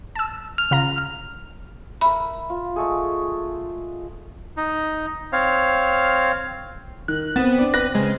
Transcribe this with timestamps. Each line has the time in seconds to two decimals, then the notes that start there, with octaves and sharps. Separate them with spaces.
0.15 A5 E6
0.58 F6
0.71 C#3 F4 A#5
2.01 A#4 E5 B5
2.50 F4
2.76 G#3 A3 G#4
4.57 D#4
5.33 C4 C#5 F5
7.08 D#3 F#6
7.36 B3 C4 A6 E7
7.58 D4 D5
7.74 B4 F#6 A#6
7.95 C#3 G#3